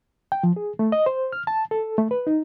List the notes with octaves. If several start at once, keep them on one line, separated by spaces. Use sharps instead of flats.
G5
F3
G#4
A3
D#5
C5
F6
A5
A4
A3
B4
D#4